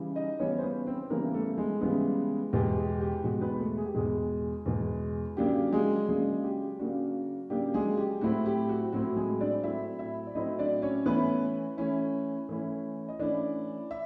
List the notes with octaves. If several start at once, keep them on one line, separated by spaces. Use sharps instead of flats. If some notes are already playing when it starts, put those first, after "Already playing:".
Already playing: C#3 E3 G3
D#4 D#5
C#3 E3 G3 B3 C#4 C#5
C5
B3 B4
C4 C5
C#3 E3 G3 A#3 B3 A#4
A3 A4
G#3 G#4
C#3 E3 G3 B3
E2 B2 G#3 G4
G4
G4
E2 B2 G#3 F#4
B3 B4
A3 A4
G#4
G4
E2 B2 G#3 G#4
E2 B2 G#3
C#3 F#3 A#3 D4 G4
G#3 G#4
C#3 F#3 G#3 A#3 D4 G#4
G4
C#3 F#3 A#3 D4 F#4
C#3 F#3 A#3 D4 G4
G#3 G#4
G4
A2 F#3 A3 C4 E4 F#4
G4
F#4
A2 F#3 A3 C4 E4 F#4
G#3 G#4
D4 D5
A2 F#3 A3 C4 E4 E5
E4 E5
D5
A2 F#3 A3 C4 D#4 E4 D#5
D4 D5
C#4 C#5
E3 A3 B3 C#4 E4 B4
E3 A3 C#4 E4
E3 A3 C#4 E4
D#5
E3 A3 C#4 D4 E4 D5
E5